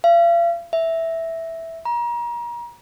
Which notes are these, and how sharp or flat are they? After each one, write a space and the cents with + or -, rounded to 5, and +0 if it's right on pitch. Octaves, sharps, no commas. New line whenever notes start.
F5 -40
E5 -5
A#5 +35